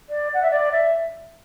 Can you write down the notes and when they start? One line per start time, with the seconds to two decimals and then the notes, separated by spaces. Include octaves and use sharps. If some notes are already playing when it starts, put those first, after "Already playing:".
0.09 D5
0.34 F#5
0.42 E5
0.51 D5
0.72 E5